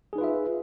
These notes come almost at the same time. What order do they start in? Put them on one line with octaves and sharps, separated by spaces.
G#4 D#4 B4 F4 E5